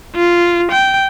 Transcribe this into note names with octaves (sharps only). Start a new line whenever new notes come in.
F4
G5